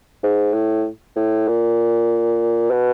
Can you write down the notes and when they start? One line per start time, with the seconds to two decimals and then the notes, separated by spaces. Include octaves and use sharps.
0.23 G#2
0.54 A2
1.16 A2
1.48 A#2
2.71 B2